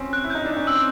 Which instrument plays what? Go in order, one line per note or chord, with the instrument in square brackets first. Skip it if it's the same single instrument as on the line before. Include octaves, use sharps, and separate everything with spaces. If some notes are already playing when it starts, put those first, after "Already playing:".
Already playing: [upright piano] C4 C#4
[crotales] F#6
[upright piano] E4
[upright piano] D#4 [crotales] G6
[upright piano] D4 [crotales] G6
[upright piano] C#4
[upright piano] C4 [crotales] E6